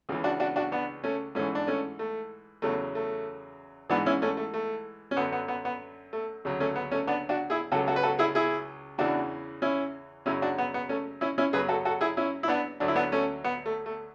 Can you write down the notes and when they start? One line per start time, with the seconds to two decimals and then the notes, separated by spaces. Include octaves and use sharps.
0.09 C#2 C#3 E3
0.24 D4 F#4
0.40 D4 F#4
0.56 D4 F#4
0.72 B3 D4
1.04 A3 C#4
1.35 G#2 E3 A3 C#4
1.55 D4
1.67 A3 C#4
1.99 A3
2.62 E2 C#3 F#3 A3
2.95 A3
3.90 G#2 E3 B3 D4
4.06 C#4 E4
4.22 A3 C#4
4.37 A3
4.54 A3
5.11 C#4
5.17 F#2 D3 F#3 B3
5.32 B3
5.48 B3
5.65 B3
6.13 A3
6.45 D2 C#3 F#3
6.60 A3 C#4
6.76 B3
6.91 A3 C#4
7.07 B3 D4
7.29 D4 F#4
7.50 E4 G#4
7.72 C#2 C#3 F#3 F#4 A4
7.87 F#4 A4
7.96 B4
8.03 F#4 A4
8.19 E4 G#4
8.35 E4 G#4
8.98 E2 C#3 E3 D4 F#4
9.62 C#4 E4
10.26 F#2 C#3 F#3 C#4 E4
10.42 D4 F#4
10.58 B3
10.74 B3
10.89 A3 C#4
11.21 C#4 E4
11.38 C#4 E4
11.53 F#2 C#3 F#3 G#4 B4
11.68 F#4 A4
11.85 F#4 A4
12.01 E4 G#4
12.17 C#4 E4
12.43 E4
12.48 B3 D4
12.80 D2 D3 F#3 D4
12.88 E4
12.96 B3 D4
13.12 A3 C#4
13.44 B3
13.66 A3
13.86 A3